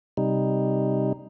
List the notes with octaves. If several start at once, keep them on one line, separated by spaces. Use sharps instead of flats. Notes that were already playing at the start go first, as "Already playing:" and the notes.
C3 G3 D#4